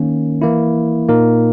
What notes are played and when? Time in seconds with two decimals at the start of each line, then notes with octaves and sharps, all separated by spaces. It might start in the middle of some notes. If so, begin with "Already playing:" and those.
Already playing: D#3 A#3 C#4
0.42 E3 A#3 E4
1.09 A#2 A#3 D#4 A#4